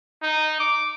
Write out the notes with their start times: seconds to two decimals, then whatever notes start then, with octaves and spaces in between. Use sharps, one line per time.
0.23 D#4
0.60 D6